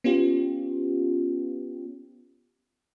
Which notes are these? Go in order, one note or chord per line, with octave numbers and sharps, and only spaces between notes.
B3 C#4 F4 G4